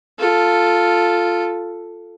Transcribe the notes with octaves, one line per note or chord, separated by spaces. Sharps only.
F4 A4